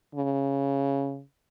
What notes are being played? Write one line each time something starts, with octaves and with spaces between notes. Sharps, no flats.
C#3